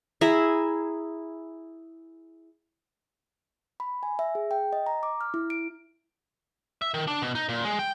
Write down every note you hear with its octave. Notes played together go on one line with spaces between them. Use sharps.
E4 G#4 E5 A#5
B5
G#5
E5
G#4
G5
D#5
A#5
D6
F6
E4
D7
E5
D#3
D4
B2
D#4
A#2
G#3
G5